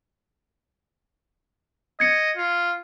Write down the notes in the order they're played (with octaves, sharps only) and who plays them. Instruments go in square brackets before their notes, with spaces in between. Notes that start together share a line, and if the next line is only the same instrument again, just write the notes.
[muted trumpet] D#5 [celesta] G#6 C#7
[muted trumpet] F4